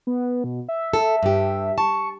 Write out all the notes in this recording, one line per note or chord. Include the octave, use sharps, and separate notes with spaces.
B3
B2
E5
A4
G2 G4
A5 C#6